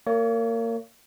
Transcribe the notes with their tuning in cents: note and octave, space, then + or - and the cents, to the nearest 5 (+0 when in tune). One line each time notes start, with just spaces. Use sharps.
A#3 -25 C#5 +30